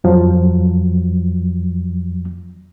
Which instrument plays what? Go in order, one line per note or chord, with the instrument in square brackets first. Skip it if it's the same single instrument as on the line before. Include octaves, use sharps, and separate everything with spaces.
[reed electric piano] F2 F3 F#3